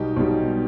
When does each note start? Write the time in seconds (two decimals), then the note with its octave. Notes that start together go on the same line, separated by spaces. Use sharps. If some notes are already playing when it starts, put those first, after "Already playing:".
Already playing: B1 B2 G3 D#4 G4
0.16 B1 B2 G3